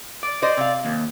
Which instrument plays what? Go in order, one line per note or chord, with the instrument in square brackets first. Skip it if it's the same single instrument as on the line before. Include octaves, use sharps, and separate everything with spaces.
[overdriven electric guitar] D5
[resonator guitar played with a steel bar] C5 D#5 [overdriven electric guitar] D5
[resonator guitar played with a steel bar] C3 F5
[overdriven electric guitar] D#2